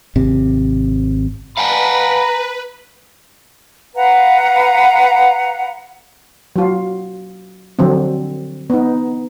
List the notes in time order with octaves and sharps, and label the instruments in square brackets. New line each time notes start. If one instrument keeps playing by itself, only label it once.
[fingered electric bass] G#1 C3
[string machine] B4 [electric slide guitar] F5 F#5 G#5 [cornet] A#5 [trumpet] B5
[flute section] B4 F5 F#5 A#5
[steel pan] F#3 F4
D3 F3 F#3 C4
B3 D#4